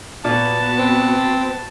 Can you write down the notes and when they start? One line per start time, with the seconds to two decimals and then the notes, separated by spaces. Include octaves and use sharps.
0.25 A#2 B3 F#4 A5
0.79 C4